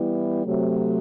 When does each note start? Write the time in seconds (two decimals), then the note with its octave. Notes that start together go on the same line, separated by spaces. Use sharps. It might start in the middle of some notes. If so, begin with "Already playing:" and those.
Already playing: E3 G3 B3 E4
0.44 C3 F#3 A3